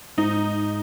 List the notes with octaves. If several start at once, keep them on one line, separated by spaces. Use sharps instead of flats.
G#2 D#4